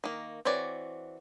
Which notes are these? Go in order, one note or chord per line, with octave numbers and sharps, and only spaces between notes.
D#3 A#3
E3 C4 F#4 C#5 D5